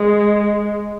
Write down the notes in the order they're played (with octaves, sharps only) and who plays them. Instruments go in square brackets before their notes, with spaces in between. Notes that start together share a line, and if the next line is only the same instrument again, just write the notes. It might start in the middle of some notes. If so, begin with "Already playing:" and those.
Already playing: [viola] G#3